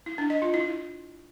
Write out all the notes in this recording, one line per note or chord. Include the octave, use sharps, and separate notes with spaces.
E4
D4
D#5
F4
E4